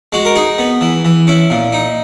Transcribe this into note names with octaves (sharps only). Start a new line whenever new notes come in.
G#3 F#4
A#4
D#4 G#4
B3
E3
E3
C#4 E4
A#2
D#4